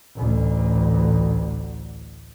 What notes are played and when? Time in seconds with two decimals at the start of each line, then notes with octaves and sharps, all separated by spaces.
0.16 A1 D2